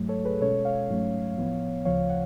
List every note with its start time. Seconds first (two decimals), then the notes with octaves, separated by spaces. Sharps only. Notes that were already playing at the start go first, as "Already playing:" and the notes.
Already playing: G#2 F#3 A3
0.09 A4 C#5
0.25 G#4 B4
0.41 B2 G#3 C#4 A4 C#5
0.65 C#5 F5
0.89 G#2 F#3 A3 C#4
1.37 A2 F3 B3
1.85 D2 C#3 F3 C#5 F5
2.10 F#5